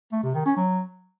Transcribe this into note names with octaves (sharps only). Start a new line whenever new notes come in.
A3
C3
D#3
C#4
F#3